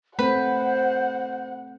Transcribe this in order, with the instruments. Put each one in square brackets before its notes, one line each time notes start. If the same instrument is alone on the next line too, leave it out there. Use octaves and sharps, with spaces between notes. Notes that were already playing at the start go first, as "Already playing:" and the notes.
[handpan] A3 C4 [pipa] B4 [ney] C5 [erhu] F#5